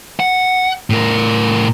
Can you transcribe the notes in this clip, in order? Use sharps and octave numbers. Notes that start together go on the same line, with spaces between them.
F#5
A2 A#4